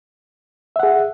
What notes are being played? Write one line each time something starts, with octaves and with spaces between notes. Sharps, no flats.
G#4 E5 F#5